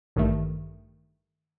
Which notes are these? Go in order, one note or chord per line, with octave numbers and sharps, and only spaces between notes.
A1 G2 D#3 A3